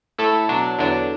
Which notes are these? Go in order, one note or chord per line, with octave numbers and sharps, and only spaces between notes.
A2 A3 E4 A4
B2 F#3 D4
E2 D3 F#3 D4